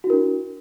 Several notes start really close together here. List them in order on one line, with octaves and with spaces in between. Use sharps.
F#4 E4 A#4 D4